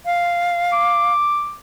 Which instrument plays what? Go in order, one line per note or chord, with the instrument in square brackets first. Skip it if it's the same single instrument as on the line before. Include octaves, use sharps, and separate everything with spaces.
[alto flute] F5
[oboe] D6